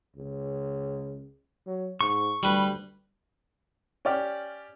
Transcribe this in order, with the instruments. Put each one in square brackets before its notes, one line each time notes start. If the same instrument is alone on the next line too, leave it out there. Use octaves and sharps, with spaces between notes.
[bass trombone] C#2
F#3
[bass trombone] G#2 [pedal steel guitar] C#6
[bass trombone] D2 [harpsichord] G3 B4
[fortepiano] C#4 G4 D5 F6